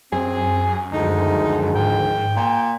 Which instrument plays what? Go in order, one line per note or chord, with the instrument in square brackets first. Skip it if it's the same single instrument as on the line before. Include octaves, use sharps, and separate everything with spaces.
[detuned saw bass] F#2 [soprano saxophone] C4 [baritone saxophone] G#4
[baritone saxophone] D2 [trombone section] D#3 F3 G#3 [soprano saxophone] D#4
[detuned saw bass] G#2 [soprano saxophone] G5
[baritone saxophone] A#2